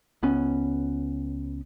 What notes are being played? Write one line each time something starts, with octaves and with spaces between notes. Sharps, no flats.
C#2 B3 C#4